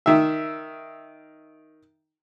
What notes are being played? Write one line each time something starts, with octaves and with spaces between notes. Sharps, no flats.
D#3 E5